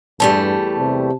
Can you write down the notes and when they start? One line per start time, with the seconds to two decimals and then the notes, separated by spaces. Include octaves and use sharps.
0.20 E2 G2 G3 A3 A5
0.78 C3